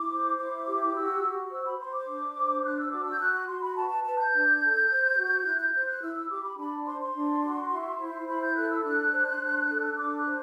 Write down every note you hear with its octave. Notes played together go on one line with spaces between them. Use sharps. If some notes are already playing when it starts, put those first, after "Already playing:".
Already playing: E4 D6
C5
E4 D6
G4
F#4 E6
F#4
C5 E6
B5
C5 C6
D6
D4
C5
D4 F#6
E6
F#4 D6
E6
G6
F#4 F#6
F#6
F#4 C6
B5
B4 A5
A5
B4 A5
G6
D4
A4
C5
F#4
E4 F#6
G6
C5 G6
F#6
E4 E6
E6
G4 D6
B5
D4 B5
C5 C6
C6
D4
F#4
E4
C5
E4 B5
G6
A4 F#6
E6
D4 F#6
C5
D4
A4
D4 D6
F#6
C5